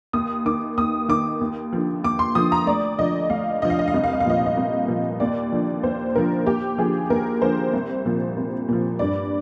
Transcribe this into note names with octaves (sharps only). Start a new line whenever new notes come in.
D#2 D#6
D#3 D6
D#2 D#6
D#3 D6
D#2
D3 F3
D#2 D6
C6
D3 F3 D#6
A#5
D2 D5
D3 F3 D#5
D2 F5
D3 F3 D#5
F5
D#5
F5
C2 D#5
F5
D#5
F5
A#2 F3 D#5
F5
D#5
C2
A#2 F3
D#2 D5
D3 F3
D#2 C5
D3 F3 A#4
D#2 G4
D3 F3 G#4
D#2 A#4
D3 F3 C5
C2
A#2 F3
C2
A#2 F3
G2 D5